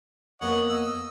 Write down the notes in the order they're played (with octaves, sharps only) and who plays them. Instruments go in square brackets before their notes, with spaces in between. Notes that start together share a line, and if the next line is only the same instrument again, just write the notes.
[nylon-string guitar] F2 A#3 B3 [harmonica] C#5 D#5 F#5
[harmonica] D#5 E6